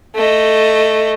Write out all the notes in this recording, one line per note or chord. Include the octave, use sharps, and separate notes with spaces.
A3 D#5